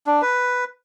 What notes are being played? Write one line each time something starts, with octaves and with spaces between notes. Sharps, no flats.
D4
B4